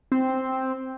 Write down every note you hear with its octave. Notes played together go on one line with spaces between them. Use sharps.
C4